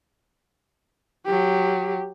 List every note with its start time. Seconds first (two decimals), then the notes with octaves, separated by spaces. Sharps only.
1.25 F#3 G4